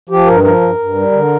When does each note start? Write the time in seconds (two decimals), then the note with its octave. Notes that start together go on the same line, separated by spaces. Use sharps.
0.09 F3 G4
0.26 G2 A#4
0.44 F3 A#4
0.61 G2
0.79 G2
0.95 G3
1.12 D3